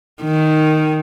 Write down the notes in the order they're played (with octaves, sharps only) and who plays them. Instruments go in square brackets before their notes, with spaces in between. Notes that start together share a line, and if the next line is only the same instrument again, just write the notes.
[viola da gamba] D#3